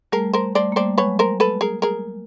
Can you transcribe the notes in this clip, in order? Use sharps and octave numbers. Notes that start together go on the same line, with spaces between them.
G3 A3 G#4 A#4
A#4 C5
G3 A3 C5 D5
A#3
G3 A3 C5 D5
F#3 G#3 B4 C#5
A#4 C5
A4 B4
G#4 A#4
G#4 A#4